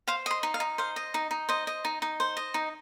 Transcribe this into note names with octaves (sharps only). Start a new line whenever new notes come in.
C5 F5
D#5 C6
D#4
F5
D#4
C5 F5
D#5
D#4
D#4
C5 D#5
D#5
D#4
D#4
C5
D#5
D#4